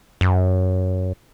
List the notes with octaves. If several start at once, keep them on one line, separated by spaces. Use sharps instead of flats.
F#2